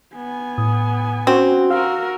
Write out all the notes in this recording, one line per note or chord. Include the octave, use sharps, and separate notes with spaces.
B3 G#5
A2 D#6
C4 C#4 F#4
F#4 A#4 F5 E6